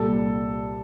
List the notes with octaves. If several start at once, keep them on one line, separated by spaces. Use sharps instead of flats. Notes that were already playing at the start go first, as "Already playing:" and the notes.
Already playing: C2 A#2 G3 A4